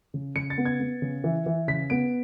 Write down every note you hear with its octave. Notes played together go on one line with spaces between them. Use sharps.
C#3
C#3 C#7
A6
B3
G#6
B3
C#3
E3
E3
C#3 B6
B3 D7